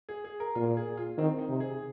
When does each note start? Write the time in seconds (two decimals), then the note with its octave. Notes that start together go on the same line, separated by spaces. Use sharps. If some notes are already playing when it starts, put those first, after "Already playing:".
0.09 G#4
0.24 G#4
0.40 A#4
0.55 A#2 F4
0.77 G#4
0.97 F4
1.18 D#3 C4
1.38 D#4
1.49 C3
1.60 G#4